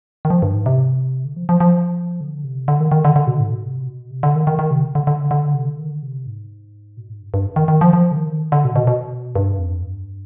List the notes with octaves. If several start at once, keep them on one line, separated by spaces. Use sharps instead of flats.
D#3
F3
G2
G#2
C3
D3
F3
F3
F3
D3
C3
D3
D#3
D#3
D3
D3
B2
G#2
B2
C3
B2
C3
D3
D#3
D#3
D#3
C3
D3
D3
D3
D3
C3
D3
D#3
D3
C3
G#2
B2
G#2
G2
G2
D#3
D#3
F3
F3
D3
D#3
D3
B2
B2
B2
G2
F2
G2